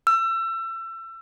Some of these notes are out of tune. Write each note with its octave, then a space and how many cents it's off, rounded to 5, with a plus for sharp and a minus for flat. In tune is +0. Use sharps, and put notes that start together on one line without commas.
E6 +30